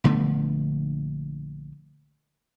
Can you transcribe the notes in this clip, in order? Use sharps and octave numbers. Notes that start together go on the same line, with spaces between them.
A#1 D3 A3 B3